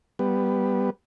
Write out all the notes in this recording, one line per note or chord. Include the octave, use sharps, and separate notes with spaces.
G3 B3